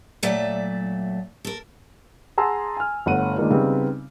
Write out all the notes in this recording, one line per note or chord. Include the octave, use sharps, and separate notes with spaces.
A#2 F#3 A3 D5 E5
A4 A#4
G#4 F#5 A5 A#5 C6 E6
G#5 F6
G1 A3 C#5 F#5 D#7
D#3 G#3 A#3 D4 D#4 F4
C#3 G3 B3 C4 D#4